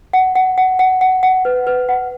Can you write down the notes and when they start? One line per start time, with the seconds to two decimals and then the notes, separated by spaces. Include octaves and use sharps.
0.13 F#5
0.35 F#5
0.58 F#5
0.79 F#5
1.01 F#5
1.23 F#5
1.45 B4
1.67 B4
1.89 F#5